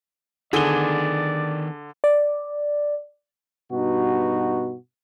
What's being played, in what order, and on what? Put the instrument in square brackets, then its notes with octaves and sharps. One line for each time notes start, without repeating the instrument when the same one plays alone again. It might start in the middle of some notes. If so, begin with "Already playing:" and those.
[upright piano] D3 G7 [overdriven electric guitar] D#3 B3 [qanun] G#4 A4 G#5 [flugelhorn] D5
[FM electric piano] D5
[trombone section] G2 B2 D#4 F#4